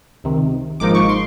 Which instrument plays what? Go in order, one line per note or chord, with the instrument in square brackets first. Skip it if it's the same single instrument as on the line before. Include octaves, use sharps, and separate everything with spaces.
[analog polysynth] C#2 C3 D#3
G#1 G#2 F3 A#3 D#4 D6
C#6
C6